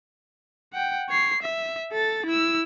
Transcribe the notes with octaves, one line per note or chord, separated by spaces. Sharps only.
F#5 G5
C#5 C7
E5
A4 A6
E4 E6